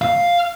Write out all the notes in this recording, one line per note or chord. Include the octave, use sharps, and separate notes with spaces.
F5